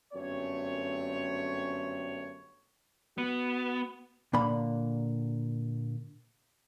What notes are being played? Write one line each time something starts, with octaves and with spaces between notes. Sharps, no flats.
G1 F#2 A3 C4 C#5
B3 F#4
A#2 D3 A#3 B5